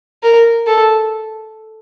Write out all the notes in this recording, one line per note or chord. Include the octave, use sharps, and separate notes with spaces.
A#4
A4